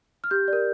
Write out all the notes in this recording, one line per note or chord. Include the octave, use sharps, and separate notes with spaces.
F6
G4 G6
A#4 D5